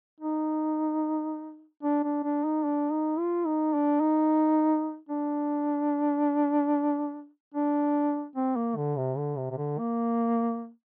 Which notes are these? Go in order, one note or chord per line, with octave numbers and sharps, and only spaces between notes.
D#4
D4
D4
D4
D#4
D4
D#4
F4
D#4
D4
D#4
D4
D4
C4
A#3
D3
C3
D3
C3
C3
D3
A#3